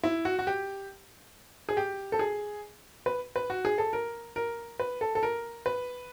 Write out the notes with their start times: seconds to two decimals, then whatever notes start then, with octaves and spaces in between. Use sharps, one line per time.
0.03 E4
0.25 F#4
0.39 F#4
0.47 G4
1.69 G#4
1.77 G4
2.12 A4
2.19 G#4
3.06 B4
3.36 B4
3.50 F#4
3.65 G#4
3.78 A4
3.93 A#4
4.36 A#4
4.80 B4
5.01 A4
5.15 A4
5.23 A#4
5.66 B4